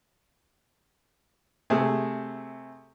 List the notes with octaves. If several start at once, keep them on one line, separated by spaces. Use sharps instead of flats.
C3 A3 G#4